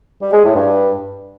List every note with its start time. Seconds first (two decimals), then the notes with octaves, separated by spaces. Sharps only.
0.22 G3
0.33 G#3
0.44 A2
0.55 G2